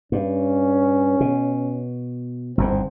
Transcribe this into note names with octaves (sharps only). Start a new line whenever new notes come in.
G2 C#4
B2
G1 E2 G#2 C4